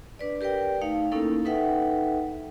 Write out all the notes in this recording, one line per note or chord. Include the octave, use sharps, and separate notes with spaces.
D4 B4 D5
G4 A#4 B4 D5 G5
A3 D#4 F5
A#3 C#4 D#4 E4 A4 A#4
D#4 A4 B4 E5 F#5 G5